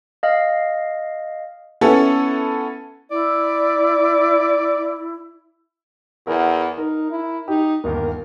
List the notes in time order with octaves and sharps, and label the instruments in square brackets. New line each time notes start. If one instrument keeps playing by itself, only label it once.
[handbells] D#5 F5
[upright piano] B3 C#4 E4 A4
[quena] E4 [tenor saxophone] D5
[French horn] E2 [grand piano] E4 A#4 F#5
[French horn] D#4 [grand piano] A#4
[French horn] E4
[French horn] D#4 [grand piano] G4
[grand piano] G1 D#2 [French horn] A#4